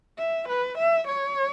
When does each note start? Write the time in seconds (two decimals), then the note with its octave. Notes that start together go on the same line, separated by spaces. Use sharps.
0.18 E5
0.49 B4
0.78 E5
1.08 C#5